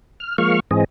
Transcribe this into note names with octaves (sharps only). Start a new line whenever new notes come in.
F6
F3 G#3 A#3 F5 C#6 F6
G#2 E3 C4 G#4 D#5